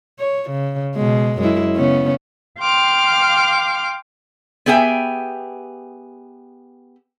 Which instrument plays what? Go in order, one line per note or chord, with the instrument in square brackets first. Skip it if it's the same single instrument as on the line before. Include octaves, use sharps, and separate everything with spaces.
[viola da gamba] C#5
C#3
B2 G#3
F#2 G#3 E4
C#3 B3 C#4
[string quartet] F5 G5 C6 D6 F6
[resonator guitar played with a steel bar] B3 G4 G#4 E5 G5